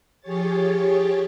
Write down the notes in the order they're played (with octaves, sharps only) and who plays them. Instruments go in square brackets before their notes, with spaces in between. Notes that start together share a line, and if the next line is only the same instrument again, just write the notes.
[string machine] F3 G4 G#4 C#5 A6